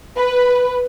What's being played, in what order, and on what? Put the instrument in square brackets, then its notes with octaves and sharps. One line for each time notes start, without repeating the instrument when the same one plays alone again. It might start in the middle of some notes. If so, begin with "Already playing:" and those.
[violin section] B4